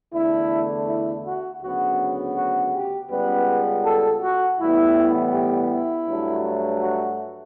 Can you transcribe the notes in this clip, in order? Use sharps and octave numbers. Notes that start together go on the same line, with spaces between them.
E2 D3 A3 E4
E4
F#4
D2 C#3 F#3 B3 F#4
F#4
G4
C#2 C#3 G3 B3 B4
A4
F#4
A2 E3 G3 B3 E4
G4
E4
G2 F#3 A3
F#4